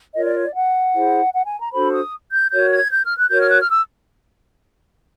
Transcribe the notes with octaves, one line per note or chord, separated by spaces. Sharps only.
F4 A#4 C#5 D#5
D5
C#5
D5
F#5
E4 G#4 C5
F#5
G#5
A#5
D4 F#4 A4 C5 B5
D#6
G6
F#4 A#4 C#5 G6
G#6
G6
F6
F#6
F#4 A#4 C#5 G6
F6
F#6
F6
E6